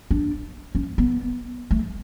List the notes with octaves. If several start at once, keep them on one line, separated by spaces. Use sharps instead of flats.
D4
C#4
B3
A3